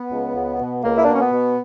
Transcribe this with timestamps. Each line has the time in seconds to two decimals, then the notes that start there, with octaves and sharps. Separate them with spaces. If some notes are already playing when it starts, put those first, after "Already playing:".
Already playing: B3
0.11 C#2
0.35 C#2
0.59 B2
0.84 C#2 A#3
0.97 E4
1.05 D4
1.08 B2 C#4
1.21 B3
1.32 B2